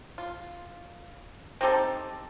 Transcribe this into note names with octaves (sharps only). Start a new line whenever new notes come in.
F4
C4 D#4 G4 A4